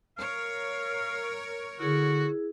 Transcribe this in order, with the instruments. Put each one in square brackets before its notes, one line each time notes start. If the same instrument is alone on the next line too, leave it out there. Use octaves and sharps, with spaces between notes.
[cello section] A#4 C#5 [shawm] F5
[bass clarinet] D3 [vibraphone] E4 G#4 [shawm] F#4